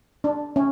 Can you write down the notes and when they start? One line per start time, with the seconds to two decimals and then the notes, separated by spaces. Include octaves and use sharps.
0.24 D4
0.56 C#4